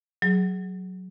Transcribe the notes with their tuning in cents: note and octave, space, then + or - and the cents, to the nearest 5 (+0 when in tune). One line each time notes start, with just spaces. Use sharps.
F#3 +0 G#4 +0